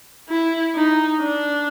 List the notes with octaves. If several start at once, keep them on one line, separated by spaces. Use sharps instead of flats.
E4
D#4
D4